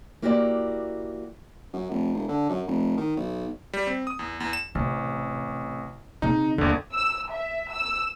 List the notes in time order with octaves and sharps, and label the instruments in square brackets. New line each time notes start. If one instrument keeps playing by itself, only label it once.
[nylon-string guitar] A#3 E4 F#4 G4 C#5 D5
[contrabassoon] F#2
F1
E1
D3
F#2
F1
D#3
B1
[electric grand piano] G3
C4
D#6
E2
E2
E7
[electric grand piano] A1 [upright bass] C3
[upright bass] C#3 C4 [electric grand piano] D#4
[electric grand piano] G1 D3 [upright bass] D#2 C4
[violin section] E6
E5
E6